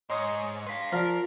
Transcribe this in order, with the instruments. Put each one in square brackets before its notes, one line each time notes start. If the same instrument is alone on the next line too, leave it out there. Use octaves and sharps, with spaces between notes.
[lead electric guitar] G#2 [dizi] C#5 [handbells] D#5 C6 D#6
[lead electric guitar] B4 F5 [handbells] C6 B6
[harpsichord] F3 F5 [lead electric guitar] A#4 [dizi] D5